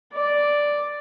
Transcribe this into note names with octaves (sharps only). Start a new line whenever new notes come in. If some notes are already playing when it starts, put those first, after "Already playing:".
D5